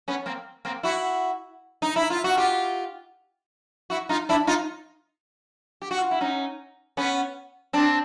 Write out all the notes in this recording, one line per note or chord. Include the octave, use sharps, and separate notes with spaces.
B3 C#4
A#3 C4
A#3 C4
E4 F#4
D#4
E4
F4
F#4
F4 G4
E4 F#4
D#4 F4
D4 E4
D#4 F4
G4
F#4
F4
E4
C#4 D#4
B3 C#4
C4 D4